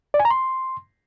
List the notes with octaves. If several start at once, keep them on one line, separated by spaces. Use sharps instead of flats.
D5
G#5
A#5
C6